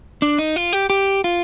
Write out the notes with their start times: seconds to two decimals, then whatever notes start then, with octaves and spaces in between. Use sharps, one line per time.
0.22 D4
0.38 D#4
0.56 F4
0.73 G4
0.90 G4
1.24 F4